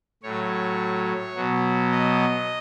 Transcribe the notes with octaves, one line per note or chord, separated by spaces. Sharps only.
A2 F#3 C#5
B2 F#3
D#5